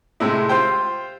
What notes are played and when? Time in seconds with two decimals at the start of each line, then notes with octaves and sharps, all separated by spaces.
0.20 A2 C3 G#3
0.49 F4 G4 C5 G5